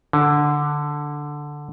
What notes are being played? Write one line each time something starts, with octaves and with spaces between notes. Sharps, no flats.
D3